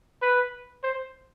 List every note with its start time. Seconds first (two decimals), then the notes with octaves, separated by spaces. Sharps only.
0.22 B4
0.84 C5